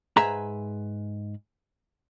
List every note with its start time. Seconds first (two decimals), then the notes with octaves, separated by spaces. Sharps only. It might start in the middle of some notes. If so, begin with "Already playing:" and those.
0.17 G#2 G#4 B4 E5 A#5